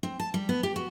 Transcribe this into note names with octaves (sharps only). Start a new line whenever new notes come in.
C4
A5
G3
B3
G4
F#4